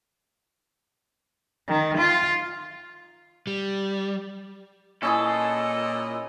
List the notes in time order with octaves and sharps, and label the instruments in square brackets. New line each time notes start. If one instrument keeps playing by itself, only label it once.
[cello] D#3
F4
[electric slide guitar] G3
[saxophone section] A#2 D#5 [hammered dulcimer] C#4 E4 G#4 [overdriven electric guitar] A4